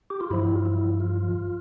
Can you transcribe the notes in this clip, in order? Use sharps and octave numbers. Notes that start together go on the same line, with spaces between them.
G4
F4
G2 F3 E4
F4
E4
F4